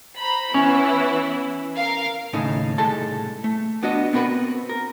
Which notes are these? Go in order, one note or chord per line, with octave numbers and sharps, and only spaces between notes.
C5 A#5 B5
E3 B3 C#4 E4 C#5
A#4 F5
D#2 A2 C#3 A3 D#4
C2 A2 G#3 A4 A5
A3
B3 D4 F#4 D#5
B3 C4 F#4 A#4 B4
A#4